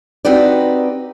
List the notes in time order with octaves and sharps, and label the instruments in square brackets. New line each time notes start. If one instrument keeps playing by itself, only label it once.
[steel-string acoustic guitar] C4 D#4 F#4 G4 B4 D5